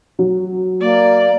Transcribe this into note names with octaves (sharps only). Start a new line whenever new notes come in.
F#3
A#3 D5